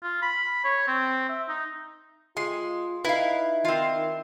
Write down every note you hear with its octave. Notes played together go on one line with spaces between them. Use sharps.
F4
B5
C#5
C4
E5
D#4
G#3 F4 C6
D#4 E4 B4 F5
D#3 C4 F4